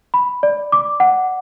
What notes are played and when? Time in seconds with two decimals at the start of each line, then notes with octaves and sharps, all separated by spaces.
0.14 B5
0.43 D5
0.72 D6
1.00 F#5